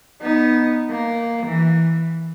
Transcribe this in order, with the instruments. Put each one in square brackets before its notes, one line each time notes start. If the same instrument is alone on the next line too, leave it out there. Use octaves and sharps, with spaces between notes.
[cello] B3 D#4
A#3
E3